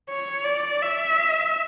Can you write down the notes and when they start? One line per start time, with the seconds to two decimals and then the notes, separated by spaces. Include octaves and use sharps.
0.09 C#5
0.44 D5
0.82 E5